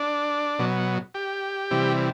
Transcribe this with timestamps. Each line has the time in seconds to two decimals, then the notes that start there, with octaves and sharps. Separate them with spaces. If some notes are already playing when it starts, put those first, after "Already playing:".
Already playing: D4
0.59 B2 F#3
1.14 G4
1.71 C3 E3 G3